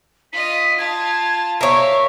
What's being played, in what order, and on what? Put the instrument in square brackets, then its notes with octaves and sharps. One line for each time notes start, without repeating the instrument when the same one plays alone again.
[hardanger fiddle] F4 D#5 [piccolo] B6
[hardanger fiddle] F4 A5 [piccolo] G#6
[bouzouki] A#4 C#5 [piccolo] E5 [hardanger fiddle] F5